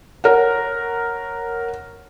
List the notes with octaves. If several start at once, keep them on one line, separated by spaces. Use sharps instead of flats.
A#4 C#5 F#5